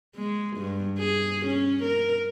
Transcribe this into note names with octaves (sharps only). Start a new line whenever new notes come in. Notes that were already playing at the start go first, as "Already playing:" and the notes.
G#3
G2
G#4
C#4
A#4